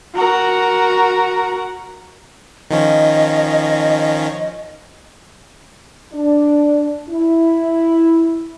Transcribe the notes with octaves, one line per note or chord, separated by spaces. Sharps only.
F#4 A#4
D#3 F3 C#4 D#5
D4
E4